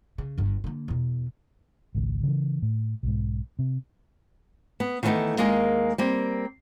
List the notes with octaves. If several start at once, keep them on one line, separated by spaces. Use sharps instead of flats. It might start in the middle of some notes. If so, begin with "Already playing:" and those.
C#3
G1 G2
D3 A#3
E2 B2
G#1 C#2
C#3 E3
A2
B1 G#2
C3
B3
D#3 E3 G3 A3 B3 D#4
D#2 G#3 A#3 D#4 G#4 A#4
G3 A#3 C4